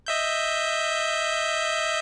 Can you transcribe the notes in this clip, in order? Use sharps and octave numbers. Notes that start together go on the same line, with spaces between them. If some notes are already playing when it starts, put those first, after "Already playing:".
D#5 E5 G6